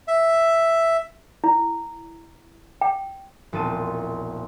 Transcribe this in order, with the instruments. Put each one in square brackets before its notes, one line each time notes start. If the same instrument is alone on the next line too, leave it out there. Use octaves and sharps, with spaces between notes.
[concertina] E5
[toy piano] E4
G5
[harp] E1 A#1 C4 A5 D#7